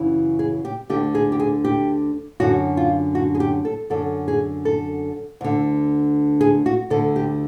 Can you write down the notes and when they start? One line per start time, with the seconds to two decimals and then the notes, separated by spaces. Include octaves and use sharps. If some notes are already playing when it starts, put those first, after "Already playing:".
Already playing: F#2 C#3 E3
0.39 G#4
0.65 G4
0.90 D3 G4
0.93 D2
1.15 G#4
1.32 G4
1.40 G#4
1.65 G4
2.40 F#2 D3 F#4
2.77 F4
3.15 F#4
3.35 G#4
3.40 G4
3.65 A4
3.90 F#2 D3 A4
4.28 G#4
4.65 A4
5.41 D2 D3
6.41 G#4
6.66 F#4
6.90 D2 D3 A4
7.16 G4